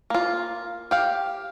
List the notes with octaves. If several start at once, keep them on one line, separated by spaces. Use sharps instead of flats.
A#3 F4
G4 F5